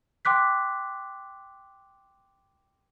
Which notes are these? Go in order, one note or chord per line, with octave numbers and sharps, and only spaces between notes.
G5 C6 D6 F#6 B6